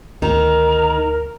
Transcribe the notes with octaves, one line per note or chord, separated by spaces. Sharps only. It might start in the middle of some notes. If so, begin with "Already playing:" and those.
D2 D#3 A#4 A#5